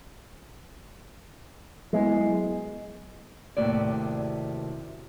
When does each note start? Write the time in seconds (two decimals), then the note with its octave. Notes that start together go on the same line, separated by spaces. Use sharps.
1.93 F#3 G#3 B3 E4
3.57 D#2 A2 C3 F#4 D5